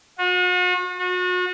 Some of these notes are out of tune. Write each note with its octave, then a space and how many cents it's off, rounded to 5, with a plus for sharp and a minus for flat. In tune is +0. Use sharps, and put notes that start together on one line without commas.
F#4 -40
F#4 -35